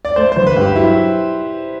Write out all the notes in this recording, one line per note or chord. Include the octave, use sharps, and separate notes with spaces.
D5
A3 C5
G1 C5
B4
G2 G4
F#3 E4